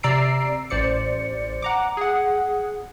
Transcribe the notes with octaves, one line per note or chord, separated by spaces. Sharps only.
C3 D5 A#5 E6 C7 D7
A1 C5 D5 C#7
F#5 A#5 D6
G#4 F#5